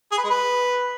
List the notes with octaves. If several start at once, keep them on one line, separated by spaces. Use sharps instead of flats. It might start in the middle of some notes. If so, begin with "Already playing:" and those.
G#4
B4
G#3
B4